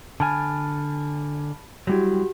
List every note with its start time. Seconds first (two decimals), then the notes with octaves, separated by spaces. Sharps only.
0.20 D3 G#5 A5 B5 F6
1.87 F#3 G3 E4 F#4 G4